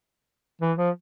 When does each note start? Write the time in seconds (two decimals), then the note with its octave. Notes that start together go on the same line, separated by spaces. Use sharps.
0.61 E3
0.78 F3